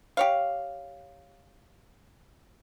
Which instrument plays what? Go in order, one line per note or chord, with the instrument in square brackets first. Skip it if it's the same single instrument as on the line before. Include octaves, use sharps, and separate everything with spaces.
[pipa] G4 C#5 F5